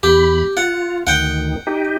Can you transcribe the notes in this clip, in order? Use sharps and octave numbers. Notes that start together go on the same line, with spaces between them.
E2 G4 B5
F4 F#5
D2 D#3 F#5 G5
D#4 G4